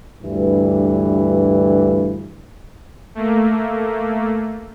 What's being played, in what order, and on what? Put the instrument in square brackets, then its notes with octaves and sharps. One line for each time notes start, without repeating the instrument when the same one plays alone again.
[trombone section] D2 G2 E3
[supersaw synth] A3 A#3